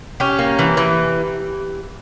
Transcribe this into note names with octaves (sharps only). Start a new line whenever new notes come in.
C#4 G4
A#3
E3
E3